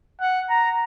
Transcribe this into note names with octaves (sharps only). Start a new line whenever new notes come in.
F#5
A#5